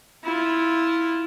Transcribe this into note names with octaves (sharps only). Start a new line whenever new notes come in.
E4 F4